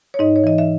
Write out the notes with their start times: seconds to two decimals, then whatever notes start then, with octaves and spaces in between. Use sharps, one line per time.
0.14 C#5
0.19 G#2 D#4 D#5
0.36 C#5
0.44 E3 D#5
0.58 E5